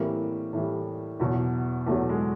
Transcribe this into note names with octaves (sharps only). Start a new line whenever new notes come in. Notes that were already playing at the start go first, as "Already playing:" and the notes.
Already playing: A2 E3 G3 A#3 C4
A2 E3 G3
E2 B2 F#3
E2 B2 F#3 A3
G#3